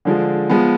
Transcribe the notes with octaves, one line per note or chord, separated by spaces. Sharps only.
D3 F3 G#3
F3 G#3 B3